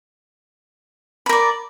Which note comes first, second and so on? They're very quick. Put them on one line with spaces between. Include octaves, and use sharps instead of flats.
B5 A#4 D5